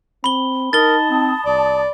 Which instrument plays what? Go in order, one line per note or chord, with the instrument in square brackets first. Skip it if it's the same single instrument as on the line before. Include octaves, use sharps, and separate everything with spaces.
[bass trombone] C4 [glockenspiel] B5 G7
[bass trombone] D#4 [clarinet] A#4 [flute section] A5 D#6 [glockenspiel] A6 G7
[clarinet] C4
[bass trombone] C2 [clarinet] D5